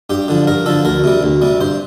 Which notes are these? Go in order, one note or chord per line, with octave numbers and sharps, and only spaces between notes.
G2 G4
D3 F3
G2 A#4
D3 F3 A4
D2 A#4
C3 G3
D2
C3 G3
G2 C5